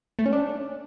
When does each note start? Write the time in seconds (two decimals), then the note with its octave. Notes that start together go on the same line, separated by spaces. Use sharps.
0.19 A3
0.26 C#4
0.33 D4